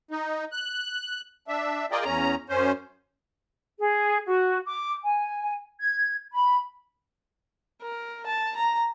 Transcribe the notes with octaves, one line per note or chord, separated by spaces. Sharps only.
D#4
F#6
D4 E5
F4 G#4 A#4 D5 D#5 G5
E2 C#4 A#5
F#2 C#4 C5
G#4
F#4
D6
G#5
G#6
B5
A#4
A5
A#5